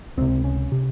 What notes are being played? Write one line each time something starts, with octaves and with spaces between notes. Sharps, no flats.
C#2 C3 C4
C#4
C3